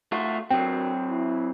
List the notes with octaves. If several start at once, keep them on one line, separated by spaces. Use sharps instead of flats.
A3 F4 F#4
F#3 C4 D4 F#4 A#4 G5
E4